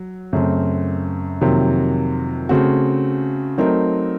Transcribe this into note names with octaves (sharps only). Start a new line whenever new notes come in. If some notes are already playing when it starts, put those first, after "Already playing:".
Already playing: F#3
F#2 C#3 A3 C4
F2 C3 D#3 F#3 A#3
C#3 A3 C4 F#4
F#3 A3 C4 D#4 A#4